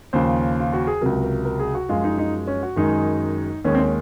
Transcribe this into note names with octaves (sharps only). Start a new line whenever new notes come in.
D#2 C#3 F3 C5
F4
F#4
G#4
C#2 C3 F#3 A#4
A#4
A#4
G#4
F#4
F#2 F3 G#3 F4
D#4
D#4
C#4
F#4
F#2 D#3 G#3 D#4
D#2 D#3 G#3 C#4
C4
C#4